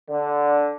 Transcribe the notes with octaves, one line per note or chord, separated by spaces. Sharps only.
D3